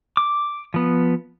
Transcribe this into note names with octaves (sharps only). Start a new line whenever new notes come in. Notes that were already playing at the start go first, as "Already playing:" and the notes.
D6
F3 B3